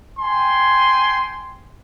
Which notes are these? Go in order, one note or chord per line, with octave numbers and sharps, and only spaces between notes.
G5 G#5 C6